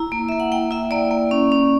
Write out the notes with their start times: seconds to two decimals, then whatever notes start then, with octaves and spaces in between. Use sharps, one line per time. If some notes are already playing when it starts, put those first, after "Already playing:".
Already playing: E4 A#5
0.12 A#3
0.29 A#3 E5
0.40 F#5
0.52 A#3 G5
0.71 E4 E5
0.91 A#3 D5
1.11 A#3
1.31 C#4
1.52 C#4